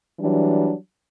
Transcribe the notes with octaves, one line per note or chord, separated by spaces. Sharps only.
E3 F#3 G3 D4